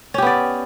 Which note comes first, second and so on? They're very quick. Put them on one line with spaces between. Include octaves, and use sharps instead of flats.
C#4 G4 B3 D5